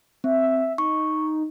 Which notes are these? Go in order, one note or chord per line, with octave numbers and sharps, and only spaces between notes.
C4 E5
D#4 C#6